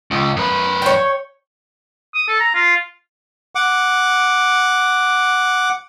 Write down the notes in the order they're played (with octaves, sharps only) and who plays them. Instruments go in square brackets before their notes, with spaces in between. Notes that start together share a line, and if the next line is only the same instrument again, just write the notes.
[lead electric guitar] C#2
F#2 B4
[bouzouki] C#5 G5
[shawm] D#6
A4
A#5
F4
[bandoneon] F#5 D6